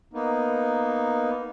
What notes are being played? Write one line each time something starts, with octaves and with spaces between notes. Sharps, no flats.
A#3 B3 D#4